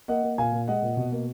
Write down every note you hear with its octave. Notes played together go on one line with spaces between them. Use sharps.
A#3 D#5 F#5
A#3
A#2 F5 G#5
A#2
G#3 D#5 F#5
A#2
B2
A#3